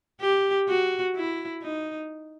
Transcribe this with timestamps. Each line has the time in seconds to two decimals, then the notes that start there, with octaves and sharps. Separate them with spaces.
0.21 G4
0.69 F#4
1.16 E4
1.62 D#4